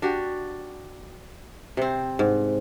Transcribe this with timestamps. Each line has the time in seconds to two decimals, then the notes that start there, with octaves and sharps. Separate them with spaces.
0.02 D4 F#4 G4
1.77 C3 C4
2.19 G#2